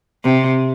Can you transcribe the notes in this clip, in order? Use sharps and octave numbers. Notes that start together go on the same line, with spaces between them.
C3